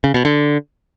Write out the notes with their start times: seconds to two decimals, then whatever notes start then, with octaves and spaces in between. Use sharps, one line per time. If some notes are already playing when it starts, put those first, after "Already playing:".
0.04 C#3
0.14 B2
0.25 D3